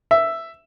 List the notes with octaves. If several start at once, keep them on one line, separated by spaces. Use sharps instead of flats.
E5